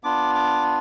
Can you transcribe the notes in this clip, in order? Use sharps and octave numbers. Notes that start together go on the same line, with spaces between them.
B3 D4 F4 D6
D6